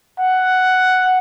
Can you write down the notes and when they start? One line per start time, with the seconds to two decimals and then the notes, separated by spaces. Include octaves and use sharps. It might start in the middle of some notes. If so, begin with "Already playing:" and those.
0.19 F#5